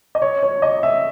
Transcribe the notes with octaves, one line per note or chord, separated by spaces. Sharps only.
D#5
C#5
C#5
D#5
E5